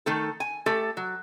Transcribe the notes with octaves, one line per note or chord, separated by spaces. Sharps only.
D#3 A3 A4
G#5
A3 G4 A4
F#3